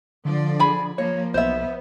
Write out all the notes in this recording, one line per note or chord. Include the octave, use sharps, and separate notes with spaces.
D3 F3 D5
G#4 B5
F3 A#3 C#5
B1 B3 C5 E5